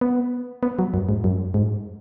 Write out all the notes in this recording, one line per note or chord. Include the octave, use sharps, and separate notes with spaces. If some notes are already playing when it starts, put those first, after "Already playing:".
B3
B3
F#3
F#2
G#2
F#2
G#2